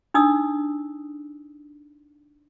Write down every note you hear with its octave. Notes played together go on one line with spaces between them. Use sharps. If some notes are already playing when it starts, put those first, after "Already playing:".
D4 D#4 D#6 E6